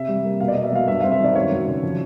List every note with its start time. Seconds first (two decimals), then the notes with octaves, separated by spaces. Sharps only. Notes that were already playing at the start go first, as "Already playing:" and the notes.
Already playing: C3 E5
0.08 G3
0.25 A#3
0.40 B2 F5
0.48 D5
0.52 B2 D#5
0.64 E5
0.72 F#3 F5
0.87 G2 E5
1.00 C4 F5
1.11 E5
1.20 D#3 D5
1.35 F#2 C#5
1.52 F#2
1.67 C#3
1.83 F3